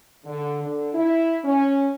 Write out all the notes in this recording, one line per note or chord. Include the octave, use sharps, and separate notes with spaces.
D3
D3
E4
C#4